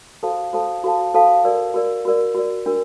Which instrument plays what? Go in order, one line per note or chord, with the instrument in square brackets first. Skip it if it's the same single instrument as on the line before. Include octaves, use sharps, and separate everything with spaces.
[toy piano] F#4 A4 C5 F5 A5
F#4 A4 C5 F5 A5
F#4 A4 C5 F5 A5
F#4 A4 C5 F5 A5
F#4 A#4 D5
F#4 A#4 D5
F#4 A#4 D5
F#4 A#4 D5
D4 F#4 A#4